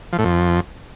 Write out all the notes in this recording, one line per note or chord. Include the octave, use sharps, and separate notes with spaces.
F3
A2
F2